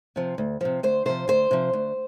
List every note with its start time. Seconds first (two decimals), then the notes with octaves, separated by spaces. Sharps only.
0.16 C3 F3
0.38 D2
0.61 C3 F3
0.83 D2 C5
1.05 C3 F3 C5
1.28 D2 C5
1.51 C3 F3
1.73 D2